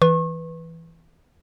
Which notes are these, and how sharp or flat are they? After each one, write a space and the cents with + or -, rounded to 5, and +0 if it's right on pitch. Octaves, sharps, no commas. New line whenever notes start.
E3 +0 B4 +0 C#6 -35